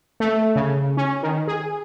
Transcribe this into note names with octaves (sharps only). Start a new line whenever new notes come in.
A3
C#3
C#4
D#3
G#4